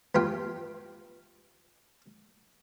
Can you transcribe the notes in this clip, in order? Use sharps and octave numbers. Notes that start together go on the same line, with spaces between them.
E2 G2 F4 G5